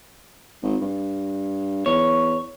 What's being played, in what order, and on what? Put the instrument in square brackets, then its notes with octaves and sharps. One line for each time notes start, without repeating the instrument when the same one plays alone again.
[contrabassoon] G#1
G2
[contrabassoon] E2 [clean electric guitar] C#5